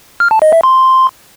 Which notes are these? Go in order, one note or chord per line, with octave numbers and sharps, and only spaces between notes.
F6
A5
D#5
E5
C6